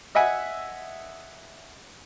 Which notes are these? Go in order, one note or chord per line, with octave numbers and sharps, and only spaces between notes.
D#5 E5 F#5 G#5